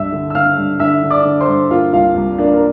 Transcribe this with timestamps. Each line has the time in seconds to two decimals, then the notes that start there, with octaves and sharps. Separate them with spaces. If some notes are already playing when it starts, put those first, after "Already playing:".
Already playing: C2 G2 E5 E6
0.12 D3
0.30 E6
0.35 D3 F5 F6
0.57 G2
0.80 D3 E5 E6
1.03 D3
1.10 D5 D6
1.25 D3
1.41 C5 C6
1.48 G2
1.71 A#3 F4 F5
1.93 C2 F4 F5
2.16 C2
2.38 A#3 D4 D5
2.54 A#4